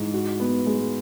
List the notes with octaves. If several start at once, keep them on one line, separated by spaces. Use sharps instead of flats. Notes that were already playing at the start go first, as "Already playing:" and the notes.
Already playing: G#2 E3
F#4
B3
G#3